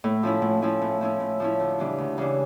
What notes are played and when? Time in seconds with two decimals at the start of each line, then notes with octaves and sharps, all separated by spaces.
0.04 A2
0.23 F3 C#4 E4
0.42 A2
0.62 F3 C#4 E4
0.82 A2
1.01 F3 C#4 E4
1.20 A2
1.40 F3 C#4 E4
1.60 D2
1.79 C#3 E3 G3 D4
1.98 D2
2.18 C#3 E3 G3 D4